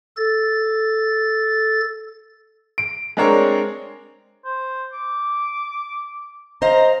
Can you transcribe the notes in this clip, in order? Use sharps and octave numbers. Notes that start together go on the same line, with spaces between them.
A4 A6
D7
G#3 C4 D4 A#4 C#5
C5
D6
C5 D#5 F5 A#5